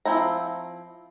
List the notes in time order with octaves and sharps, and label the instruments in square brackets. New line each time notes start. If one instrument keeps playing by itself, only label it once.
[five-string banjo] F3 C4 E4 A#5